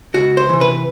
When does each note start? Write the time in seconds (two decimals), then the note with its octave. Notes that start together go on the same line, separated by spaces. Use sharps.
0.14 C#2 F#4
0.37 C5
0.49 C3 E3
0.61 B4